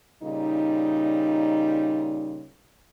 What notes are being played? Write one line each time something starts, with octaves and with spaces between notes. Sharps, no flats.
A#2 C#3 G3 D#4